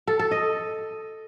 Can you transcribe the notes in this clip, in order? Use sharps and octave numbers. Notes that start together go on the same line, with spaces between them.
A4
A4
D#5